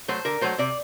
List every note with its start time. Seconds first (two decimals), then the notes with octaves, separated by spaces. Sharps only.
0.08 F#3 A3 C5
0.25 D3 A#4
0.41 F#3 A3 C5
0.58 C3 D5